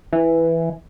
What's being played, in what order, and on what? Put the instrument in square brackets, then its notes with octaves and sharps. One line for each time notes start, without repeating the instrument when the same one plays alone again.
[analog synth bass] E3